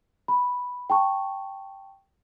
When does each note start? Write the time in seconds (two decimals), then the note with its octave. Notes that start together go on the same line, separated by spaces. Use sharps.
0.28 B5
0.90 G5 A5 C#6